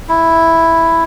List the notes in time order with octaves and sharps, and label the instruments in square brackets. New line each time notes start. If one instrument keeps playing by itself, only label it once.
[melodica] E4